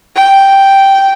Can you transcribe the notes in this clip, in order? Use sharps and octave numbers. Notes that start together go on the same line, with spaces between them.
G5